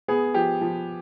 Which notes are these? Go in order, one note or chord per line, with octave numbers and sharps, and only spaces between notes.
B3 G#4
F3 G4
F3